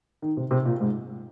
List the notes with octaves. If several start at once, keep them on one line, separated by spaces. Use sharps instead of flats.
D#3
C3
C3
A#2
G#2